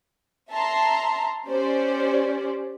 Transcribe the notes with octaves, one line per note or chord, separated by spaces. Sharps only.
E5 A5 A#5 C6
C#4 G4 C5 D5